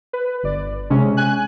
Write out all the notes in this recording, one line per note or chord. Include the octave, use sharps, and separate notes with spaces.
B4
G1 D5
C3 G#3 C#4
G#5 F#6